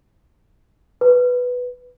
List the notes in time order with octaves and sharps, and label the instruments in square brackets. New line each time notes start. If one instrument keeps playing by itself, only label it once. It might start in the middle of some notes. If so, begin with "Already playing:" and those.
[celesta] B4